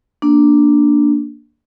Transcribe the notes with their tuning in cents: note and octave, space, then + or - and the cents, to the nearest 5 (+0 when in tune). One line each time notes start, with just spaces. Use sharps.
A#3 +0 D4 +0